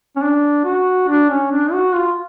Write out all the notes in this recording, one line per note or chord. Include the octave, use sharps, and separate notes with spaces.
C#4
D4
F#4
D4
C#4
D4
F#4
F4